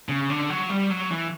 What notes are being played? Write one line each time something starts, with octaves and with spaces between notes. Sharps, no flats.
C#3
D3
F#3
G3
F#3
E3